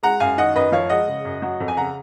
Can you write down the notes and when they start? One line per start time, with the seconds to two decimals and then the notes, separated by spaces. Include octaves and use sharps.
0.03 G#3 F#5 A#5
0.20 F#2 F5 G#5
0.38 D#3 D#5 F#5
0.55 F#2 B4 D#5
0.72 F3 C#5 F5
0.89 G#3 D#5 F#5
1.08 C#3
1.25 F#2
1.42 F#3
1.60 F2
1.68 G#5
1.77 C#3 F#5 A#5